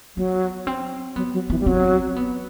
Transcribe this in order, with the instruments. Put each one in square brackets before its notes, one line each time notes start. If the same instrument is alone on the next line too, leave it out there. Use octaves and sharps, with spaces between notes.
[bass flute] F#3 [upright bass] B3
[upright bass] C4
[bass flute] F#3 [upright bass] B3
[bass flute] F#3
[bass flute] E3 [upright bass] B3
[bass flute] G3
[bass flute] F#3 [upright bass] C4
[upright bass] B3